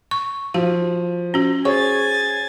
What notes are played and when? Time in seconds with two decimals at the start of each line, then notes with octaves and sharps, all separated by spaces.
0.11 C#6
0.54 F3 F#4 F5
1.34 C#4 F#4
1.65 G#4 C5 C#5 G#5 C#6 G#6 A6